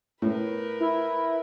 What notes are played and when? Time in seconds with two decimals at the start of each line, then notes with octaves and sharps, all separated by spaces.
0.22 A2 A#4 B4
0.80 E4